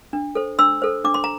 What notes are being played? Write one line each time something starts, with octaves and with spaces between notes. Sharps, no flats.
D4
A4 C5
D4 C6 E6
A4 C5
D4 D6
C6
A#5